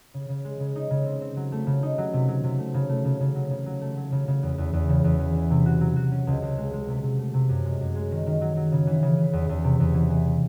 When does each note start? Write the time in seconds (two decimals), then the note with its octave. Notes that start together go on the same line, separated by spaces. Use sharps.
0.14 C#3
0.29 C#3
0.44 G#3
0.60 C#3
0.75 D#4
0.91 C#3
1.06 C4
1.21 C4
1.37 F#3
1.52 A3
1.67 C#3
1.83 D#4
1.98 F#3
2.13 C3
2.28 F#3
2.44 C3
2.58 A3
2.74 C#3
2.89 A3
3.05 C#3
3.20 C#3
3.35 F#3
3.51 C#3
3.66 F#3
3.81 A3
3.97 F#3
4.12 C#3
4.28 C#3
4.43 E2
4.58 E2
4.73 E2
4.89 C#3
5.04 E2
5.20 E3
5.35 E3
5.51 C3
5.66 F#4
5.81 F#3
5.96 F#4
6.12 C#4
6.27 C#2
6.42 C#2
6.58 G#3
6.73 G#3
6.88 C3
7.03 C3
7.19 A3
7.34 C3
7.49 F#2
7.65 G#3
7.80 F#2
7.95 G#3
8.11 D#3
8.26 D#3
8.41 F#3
8.57 F#3
8.72 C#3
8.87 E3
9.03 C#3
9.18 E3
9.33 E2
9.49 E2
9.64 C3
9.80 E2
9.94 E3
10.10 E3